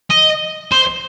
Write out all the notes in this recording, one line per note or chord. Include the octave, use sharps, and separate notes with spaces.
D#5
C5